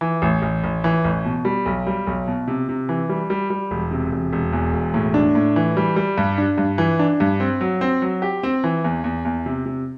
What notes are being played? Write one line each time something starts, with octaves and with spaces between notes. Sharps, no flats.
E3
A1
A1
A1
E3
A1
B2
G3
B1
G3
B1
B2
C3
C3
E3
G3
G3
G3
E1
C3
E1
E1
E2
E1
A2
D4
A2
E3
G3
G3
G2
D4
G2
E3
D4
G2
C4
F#3
C4
F#3
G4
C4
E3
E2
E2
E2
C3
C3